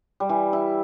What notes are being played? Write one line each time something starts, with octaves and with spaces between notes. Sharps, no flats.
G3
E3
E4